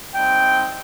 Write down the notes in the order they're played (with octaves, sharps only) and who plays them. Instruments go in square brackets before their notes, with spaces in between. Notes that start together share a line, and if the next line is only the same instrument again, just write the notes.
[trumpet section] G3 C4 D#4 G5